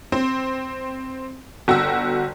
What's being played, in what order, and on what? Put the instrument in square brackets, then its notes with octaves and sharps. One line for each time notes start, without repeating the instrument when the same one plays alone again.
[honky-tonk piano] C4
G1 F#4 G5 E6